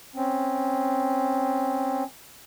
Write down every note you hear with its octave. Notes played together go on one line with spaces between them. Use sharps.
C4 C#4